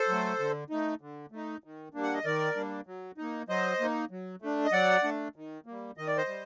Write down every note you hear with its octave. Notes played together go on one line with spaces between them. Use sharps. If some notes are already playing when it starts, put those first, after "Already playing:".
Already playing: A4 C5
F#3 A3
D3
A3 D#4
D3
A3 D#4
D#3
G3 A#3 D4
F#5
D#5
D#3 A#4 D5
G3 A#3 D4
F#3
A#3 D#4
F#3 C5 D#5
A#3 D#4
F#3
A3 D4
D#5
F#3 D5 F#5
A3 D4
D#3
G3 A#3
D#3 D#5
D5
C5 D#5
G3